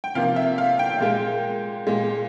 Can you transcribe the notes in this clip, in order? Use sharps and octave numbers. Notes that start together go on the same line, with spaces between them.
G5
C3 F3 A#3 F5
E5
F5
G5
A#2 G#3
A#2 G#3